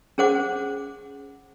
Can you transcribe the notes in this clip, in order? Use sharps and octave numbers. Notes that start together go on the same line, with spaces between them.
C#4 G#4 C5 F#5 D6